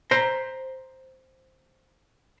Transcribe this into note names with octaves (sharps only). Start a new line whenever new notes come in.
C5 A#5